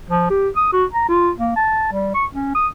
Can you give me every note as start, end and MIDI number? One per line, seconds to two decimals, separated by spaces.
0.09 0.25 53
0.30 0.49 67
0.56 0.68 87
0.72 0.85 66
0.93 1.07 82
1.08 1.31 65
1.38 1.53 58
1.56 1.88 81
1.92 2.13 55
2.14 2.26 85
2.33 2.50 61
2.55 2.67 87